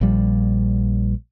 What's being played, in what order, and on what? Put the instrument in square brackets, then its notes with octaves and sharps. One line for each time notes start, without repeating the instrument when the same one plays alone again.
[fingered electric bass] A#1 F3 G3